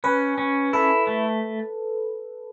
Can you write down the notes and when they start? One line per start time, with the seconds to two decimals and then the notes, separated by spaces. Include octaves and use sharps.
0.04 C#4 B4
0.38 C#4
0.73 E4 A4
1.07 A3